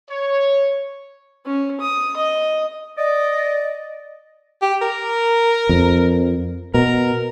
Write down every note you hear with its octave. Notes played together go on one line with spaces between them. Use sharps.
C#5
C#4
D#6
D#5
D5 D#5
G4
A#4
F2
B2 A#4